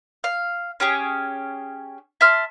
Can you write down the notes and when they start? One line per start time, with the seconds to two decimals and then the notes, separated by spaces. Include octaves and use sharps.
0.24 F5
0.80 C#4 G4 G#4
2.21 E5 A5 C6 F6